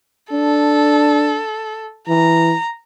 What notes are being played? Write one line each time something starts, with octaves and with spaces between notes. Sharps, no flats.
D4 A4
E3 A#5